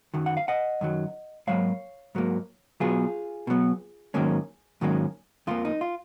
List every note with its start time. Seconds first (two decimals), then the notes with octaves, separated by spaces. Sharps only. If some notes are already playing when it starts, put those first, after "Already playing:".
0.14 F#2 D#3 F#3
0.26 F#5
0.37 F5
0.48 D#5 F#5
0.81 F#2 D#3 F#3
1.47 G#2 F#3 A#3 C#5 F5
2.15 G#2 F#3 A#3
2.80 B2 F#3 B3 F4 G#4
3.47 B2 F#3 B3
4.14 G#2 D#3 F#3 A#3 C#4
4.81 G#2 D#3 F#3 A#3 C#4
5.47 F2 F3 A#3 F4
5.65 D#4
5.81 F4